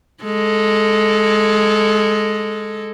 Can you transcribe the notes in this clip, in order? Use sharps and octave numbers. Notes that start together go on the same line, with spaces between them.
G#3 A4